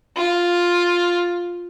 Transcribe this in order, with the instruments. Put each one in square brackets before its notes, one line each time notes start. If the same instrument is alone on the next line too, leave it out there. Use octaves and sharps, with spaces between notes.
[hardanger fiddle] F4